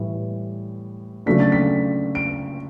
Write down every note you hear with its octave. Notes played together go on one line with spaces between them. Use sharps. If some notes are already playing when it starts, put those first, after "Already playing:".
Already playing: A2 E3 G3
C#3 F#3 A3 D4 B6
A6
B6
D7